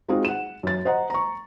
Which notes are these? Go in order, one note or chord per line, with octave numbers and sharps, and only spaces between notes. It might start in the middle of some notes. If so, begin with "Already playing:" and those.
G#3 C4 D#4 F4 F#4 G#4
F#5 E7
F#2 A6
C5 D#5 F#5 A#5
A#5 C#6